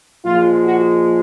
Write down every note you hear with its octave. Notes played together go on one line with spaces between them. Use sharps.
A#2 F3 G#3 F4
F#4